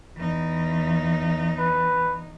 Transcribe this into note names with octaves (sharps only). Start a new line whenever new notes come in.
E2 D#4
B4